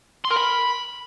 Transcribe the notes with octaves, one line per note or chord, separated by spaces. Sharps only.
C6
A#4
B5